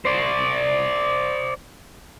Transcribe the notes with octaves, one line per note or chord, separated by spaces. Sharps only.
C5 D5